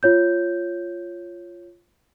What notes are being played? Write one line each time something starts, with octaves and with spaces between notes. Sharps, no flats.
F4 C#5 G6